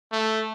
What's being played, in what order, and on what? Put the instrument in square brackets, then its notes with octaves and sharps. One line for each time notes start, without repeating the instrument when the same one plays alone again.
[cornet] A3